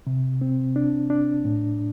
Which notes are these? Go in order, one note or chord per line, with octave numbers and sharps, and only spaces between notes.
C3
C4
D4
D4
A2